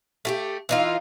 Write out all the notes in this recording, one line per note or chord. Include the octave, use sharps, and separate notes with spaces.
A3 F#4 G4
E3 D#4 F4